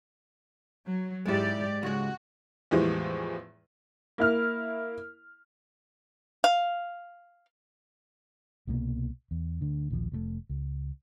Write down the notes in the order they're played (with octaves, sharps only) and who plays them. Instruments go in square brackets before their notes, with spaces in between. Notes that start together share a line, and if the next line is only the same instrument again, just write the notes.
[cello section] F#3
[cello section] G#2 G4 D5 [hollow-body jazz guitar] G#3 E4
[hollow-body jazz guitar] C#2 G#3 [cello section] F#4
[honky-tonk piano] E2 A2 E3 F3 G3 G#3
A#3 E4 F6
[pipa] F5
[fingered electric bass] C2 B2 F#3 A#3
E2
D2 D3
A#1 D#2 D3 F3
F1 A#2 A3
C#2